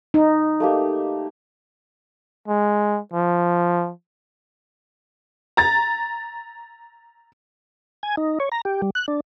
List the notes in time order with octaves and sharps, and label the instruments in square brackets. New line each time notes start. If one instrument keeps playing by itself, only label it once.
[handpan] D#4
[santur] A3 A#3 G4
[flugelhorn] G#3
F3
[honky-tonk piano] A#5 A6
[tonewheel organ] G#5
D#4
C#5
A#5
G4
G3
F#6
D4